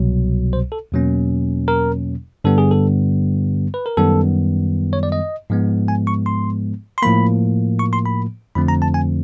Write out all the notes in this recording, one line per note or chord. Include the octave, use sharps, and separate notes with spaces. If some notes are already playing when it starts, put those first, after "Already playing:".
Already playing: C2 B2 F#3
C5
A4
E2 B2 F#3 A#3 C#4
A#4
G2 D3 G3 B3 A4
G#4
A4
B4
A#4
F#2 D#3 G3 B3 A4
C#5
D5
D#5
G#2 F3 G#3 B3
G#5
C#6
C6
C6
A2 F3 A#3 B5
C#6
C6
B5
F2 D3 F3 A3 C4 B5
A#5
A5
G#5